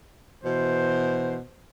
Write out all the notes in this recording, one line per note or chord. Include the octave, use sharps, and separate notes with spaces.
B2 E3 C5